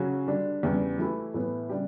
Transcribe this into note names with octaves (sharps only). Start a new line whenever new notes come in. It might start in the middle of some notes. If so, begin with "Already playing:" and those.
Already playing: C#3 F#3 C#4 F#4
D3 G3 D4
E2 C#3 G3
E3 A3 E4 G4
A2 E3 B3
C#3 G3 D4 G4